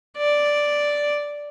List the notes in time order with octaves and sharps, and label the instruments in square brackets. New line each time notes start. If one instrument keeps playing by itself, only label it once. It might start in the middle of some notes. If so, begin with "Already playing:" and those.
[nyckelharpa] D5